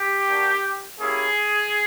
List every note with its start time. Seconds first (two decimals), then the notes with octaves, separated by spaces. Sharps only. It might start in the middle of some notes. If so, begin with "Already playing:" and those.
Already playing: G4
0.25 A#3 D4 F#4
0.99 A#3 C#4 E4 G4 G#4